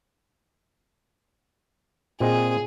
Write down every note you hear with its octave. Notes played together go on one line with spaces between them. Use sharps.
A#2 C4 G#4 D#5